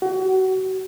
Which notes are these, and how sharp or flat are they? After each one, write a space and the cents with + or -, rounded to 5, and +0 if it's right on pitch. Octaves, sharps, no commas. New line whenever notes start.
F#4 +30